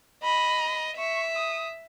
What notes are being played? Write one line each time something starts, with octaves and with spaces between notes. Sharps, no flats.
D#5 B5
E5 C#6
D#6